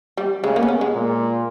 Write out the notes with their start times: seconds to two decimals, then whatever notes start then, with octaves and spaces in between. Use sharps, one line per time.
0.17 G3
0.43 C#3 G#3
0.56 A#3
0.63 B3
0.68 C#4
0.81 G#3
0.94 A#2